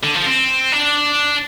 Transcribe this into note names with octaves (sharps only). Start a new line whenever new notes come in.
D3
F3
C4
D4